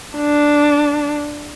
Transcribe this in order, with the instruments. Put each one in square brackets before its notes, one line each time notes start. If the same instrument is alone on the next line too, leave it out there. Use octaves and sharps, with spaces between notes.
[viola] D4